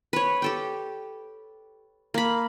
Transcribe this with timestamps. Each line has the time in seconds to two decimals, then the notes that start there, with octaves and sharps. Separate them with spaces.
0.13 B4 C#5
0.42 G4 A4 G5
2.14 A#3 B5